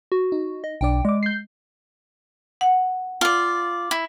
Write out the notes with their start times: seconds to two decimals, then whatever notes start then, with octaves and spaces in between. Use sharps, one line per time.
0.12 F#4
0.32 D#4
0.64 D#5
0.81 B1 D4 D5 G5
1.05 G#3 D5 D6
1.23 G6 C7
2.61 F#5
3.21 F4 D5
3.91 E4